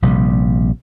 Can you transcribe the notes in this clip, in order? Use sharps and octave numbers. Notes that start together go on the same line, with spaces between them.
A#1 C3 G3